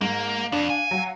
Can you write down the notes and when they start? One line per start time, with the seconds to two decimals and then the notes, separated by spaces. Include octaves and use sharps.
0.01 G#2 A#3 F5
0.52 F2 D4
0.70 G#5
0.91 F#3 F5 F#5